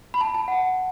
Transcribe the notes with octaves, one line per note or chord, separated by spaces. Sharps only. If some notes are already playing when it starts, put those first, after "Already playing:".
B5
A5
A5
F#5